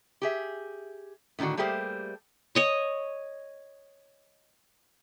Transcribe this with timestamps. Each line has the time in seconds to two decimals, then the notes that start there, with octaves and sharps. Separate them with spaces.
0.22 G4 G#4 E5
1.39 A2 D3 D#3 D4 F#4
1.57 G3 A3 A#3 G4 G#4 C5
2.55 C#5 D#5 C#6